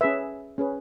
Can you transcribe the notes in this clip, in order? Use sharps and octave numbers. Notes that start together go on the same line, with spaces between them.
C#4 G#4 B4 E5
C#4 G#4 B4